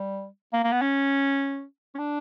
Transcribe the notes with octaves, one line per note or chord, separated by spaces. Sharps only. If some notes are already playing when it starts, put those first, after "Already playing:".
Already playing: G3
A#3
A#3
B3
C#4
C#4
D4